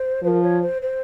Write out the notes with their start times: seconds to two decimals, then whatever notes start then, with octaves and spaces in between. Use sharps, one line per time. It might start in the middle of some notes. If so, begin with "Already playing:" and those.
Already playing: C5
0.23 F3 C5
0.27 A#4
0.42 C#5
0.61 C5
0.82 C5